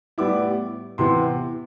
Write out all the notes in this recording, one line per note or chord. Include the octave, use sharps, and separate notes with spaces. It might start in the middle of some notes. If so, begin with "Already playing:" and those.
A2 G3 B3 E4 D6
C3 E3 B3 E4 C6